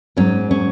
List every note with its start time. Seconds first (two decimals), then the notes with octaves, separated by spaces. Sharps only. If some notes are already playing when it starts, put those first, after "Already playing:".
0.17 G#2 F#3 C#4
0.51 C#4